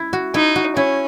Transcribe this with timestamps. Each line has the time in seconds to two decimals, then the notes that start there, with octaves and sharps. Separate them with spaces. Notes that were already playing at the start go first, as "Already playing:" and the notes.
Already playing: E4
0.13 F#4
0.34 D#4 E4
0.56 F#4
0.76 C#4 E4